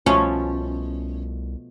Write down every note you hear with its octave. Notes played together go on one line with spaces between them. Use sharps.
C2 B2 F3 A3 C#4